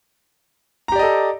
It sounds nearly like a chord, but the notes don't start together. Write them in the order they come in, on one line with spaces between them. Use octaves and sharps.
A#5 G4 D5 D#5 A4